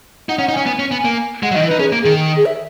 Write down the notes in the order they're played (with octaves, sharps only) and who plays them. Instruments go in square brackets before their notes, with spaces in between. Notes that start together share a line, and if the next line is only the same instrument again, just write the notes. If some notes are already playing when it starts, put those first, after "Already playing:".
[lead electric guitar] D#4 [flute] F#5
[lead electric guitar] C#4
[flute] F#5
[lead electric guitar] D#4
[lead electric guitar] C#4 [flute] G#5
[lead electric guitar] B3
C#4
B3
A#3
[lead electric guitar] G#3 [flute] F#5
[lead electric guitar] F#3
[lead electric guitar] D#3 [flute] D#5
[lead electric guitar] E3
[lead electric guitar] D#4 [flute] B4
[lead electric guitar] C#4 [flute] G#4
[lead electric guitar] A#3
[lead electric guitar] D#3 [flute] G#4
[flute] G#4
E5